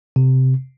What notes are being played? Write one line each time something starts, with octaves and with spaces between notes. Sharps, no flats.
C3